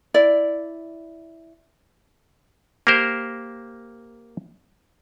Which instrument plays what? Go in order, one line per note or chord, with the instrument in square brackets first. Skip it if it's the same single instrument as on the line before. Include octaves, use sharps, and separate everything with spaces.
[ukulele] E4 D5
[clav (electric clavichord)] A#3 G4 A#4 C5